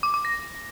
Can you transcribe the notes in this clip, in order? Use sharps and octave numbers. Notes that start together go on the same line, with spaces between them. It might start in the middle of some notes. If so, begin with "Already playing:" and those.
D6
D6
A#6